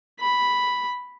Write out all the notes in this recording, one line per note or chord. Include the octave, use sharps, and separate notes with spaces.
B5